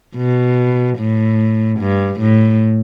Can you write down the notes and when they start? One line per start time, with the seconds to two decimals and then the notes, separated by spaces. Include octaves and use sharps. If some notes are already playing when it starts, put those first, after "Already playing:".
0.16 B2
0.98 A2
1.80 G2
2.20 A2